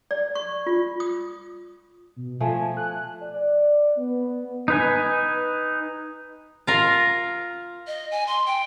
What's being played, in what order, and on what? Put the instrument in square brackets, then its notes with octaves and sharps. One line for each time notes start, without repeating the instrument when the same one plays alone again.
[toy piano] D5
C#6
F4
D#6
[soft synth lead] B2
[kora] F3 A3 [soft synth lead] G#5
[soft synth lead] F#6
[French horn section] D5
B3
[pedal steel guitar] D#4 B4 G#5
[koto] F4 A#4
[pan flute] D#5
G#5
C6
G5